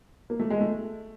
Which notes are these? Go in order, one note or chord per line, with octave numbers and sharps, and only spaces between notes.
A#3
A3
G#3
A3